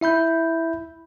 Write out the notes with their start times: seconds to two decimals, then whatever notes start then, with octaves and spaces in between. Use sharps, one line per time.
0.01 E4 E5 B5 G6